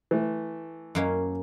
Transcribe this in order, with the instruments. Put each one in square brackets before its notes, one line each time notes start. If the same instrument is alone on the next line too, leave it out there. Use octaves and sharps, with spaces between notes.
[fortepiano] E3 A3
[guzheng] F#2 A#3 C#4